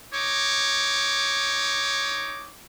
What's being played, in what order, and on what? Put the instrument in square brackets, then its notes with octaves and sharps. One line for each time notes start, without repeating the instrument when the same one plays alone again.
[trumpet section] D#4 C#5 D6